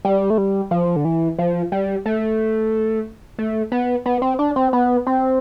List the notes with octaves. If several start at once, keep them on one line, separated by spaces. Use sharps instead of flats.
G3
A3
G3
F3
D3
E3
F3
G3
A3
A3
B3
B3
C4
D4
C4
B3
C4